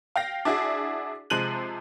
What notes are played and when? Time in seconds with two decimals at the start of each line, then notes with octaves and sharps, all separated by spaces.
0.16 F5 G5 A#6
0.45 D4 E4 F#4 G#4
1.30 C3 F3 G#3 F#6 D#7 F#7